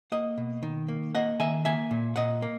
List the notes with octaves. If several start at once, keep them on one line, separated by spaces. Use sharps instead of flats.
A#3 D#5 F#5
B2
D#3
A#3
A#3 D#5 F#5
D#3 E5 G#5
A#3 E5 G#5
A#2
A#2 D#5 F#5
A#3